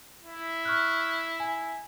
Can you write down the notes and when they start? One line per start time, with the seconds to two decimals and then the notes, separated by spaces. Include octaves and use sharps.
0.23 E4
0.65 C#6 F6 F#6
1.40 G#5